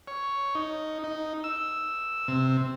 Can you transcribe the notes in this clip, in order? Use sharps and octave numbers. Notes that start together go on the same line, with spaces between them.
C#5
D#4
D#4
E6
C3